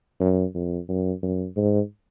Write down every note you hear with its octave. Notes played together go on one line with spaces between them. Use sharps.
F#2
F2
F#2
F#2
G#2